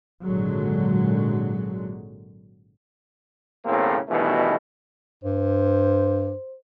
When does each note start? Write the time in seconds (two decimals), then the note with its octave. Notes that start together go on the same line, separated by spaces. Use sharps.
0.23 G#1 A#2 D3 F#3 G#3
3.65 B1 E2 A2 C#3 A#3 C4
4.09 B1 G2 B2 D#3 E3 A3
5.24 G2 C5